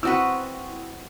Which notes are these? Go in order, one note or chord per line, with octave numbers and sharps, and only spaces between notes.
C4 E4 F#4 B4 F#5 D#6 E6